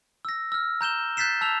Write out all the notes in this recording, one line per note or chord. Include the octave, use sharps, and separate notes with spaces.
E6 A#6
E6 F6
A#5 G6 E7 G7
F#6 G6 A6 B6 C7 E7
A5 E6 F7